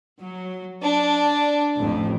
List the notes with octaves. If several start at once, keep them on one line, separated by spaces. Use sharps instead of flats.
F#3
D4
A1 F2